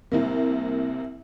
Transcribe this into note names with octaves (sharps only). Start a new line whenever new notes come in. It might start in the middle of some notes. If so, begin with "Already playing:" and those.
C2 C3 A#3